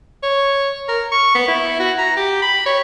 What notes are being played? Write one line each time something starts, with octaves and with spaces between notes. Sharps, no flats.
C#5
A#4
C#6
B3
E4
F#4
A#5
G4
B5
C#5